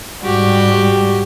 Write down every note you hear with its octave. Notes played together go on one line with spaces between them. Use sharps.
G#2 G3 F#4 G4